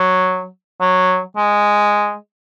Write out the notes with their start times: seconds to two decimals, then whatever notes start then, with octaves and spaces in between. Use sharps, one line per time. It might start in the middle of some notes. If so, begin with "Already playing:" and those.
Already playing: F#3
0.81 F#3
1.37 G#3